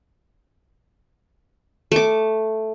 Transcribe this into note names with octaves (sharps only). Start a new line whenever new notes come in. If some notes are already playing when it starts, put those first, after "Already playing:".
A3 D6